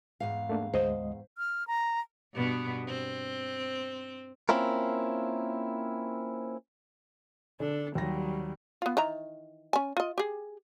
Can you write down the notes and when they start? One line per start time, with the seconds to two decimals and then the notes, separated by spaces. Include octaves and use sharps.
0.20 E2 G#2 F5
0.49 A3 A#3 D4
0.74 D2 G#3 C5 D#5
1.38 F6
1.67 A#5
2.34 G2 B2 B3
2.87 C4
4.49 A#3 C4 C#4 E4 F4 A#4
7.60 D3 D4 A4
7.95 D#2 F#3 G3 A#6
8.82 B3 F4
8.97 D#3 E3 A#5
9.73 C#4 G#5
9.97 F4 D#5
10.18 G4 G#4